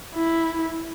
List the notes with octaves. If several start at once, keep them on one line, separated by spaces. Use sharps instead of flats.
E4